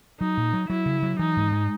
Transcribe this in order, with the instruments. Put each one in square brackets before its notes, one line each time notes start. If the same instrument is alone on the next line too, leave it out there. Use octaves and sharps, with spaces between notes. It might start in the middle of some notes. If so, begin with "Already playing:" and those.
[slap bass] F#3 [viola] D#4
[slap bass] A#2
F#3
[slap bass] F#3 [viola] E4
[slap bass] C#3
F#3
[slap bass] E3 [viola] D#4
[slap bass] G#2
G#3